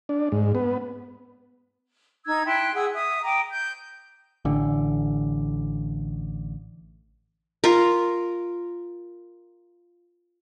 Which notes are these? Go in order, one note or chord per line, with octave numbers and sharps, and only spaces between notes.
D4
G#2
B3
D#4 E6 G#6
E4 G5 C6 F#6
G#4 F#5 E6
E5 D#6
G5 A#5 D6 D#6
G6
A1 D3
F4 A#4